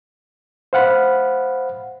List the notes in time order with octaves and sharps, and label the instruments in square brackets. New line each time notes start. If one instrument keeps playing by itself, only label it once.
[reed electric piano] C5 F5 F#5 B5